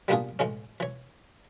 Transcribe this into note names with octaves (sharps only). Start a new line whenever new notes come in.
G3 A#3 B3 D4 F4 G#4
A2 E3 G#3 C#4
E3 C#5